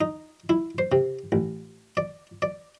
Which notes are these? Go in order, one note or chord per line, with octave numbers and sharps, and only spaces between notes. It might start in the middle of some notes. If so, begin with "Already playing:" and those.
D#4
E4
C5
C3
A1
D5
D5